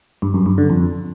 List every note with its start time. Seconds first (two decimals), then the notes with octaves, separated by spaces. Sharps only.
0.22 G2
0.34 F#2
0.46 G2
0.58 D3
0.70 F2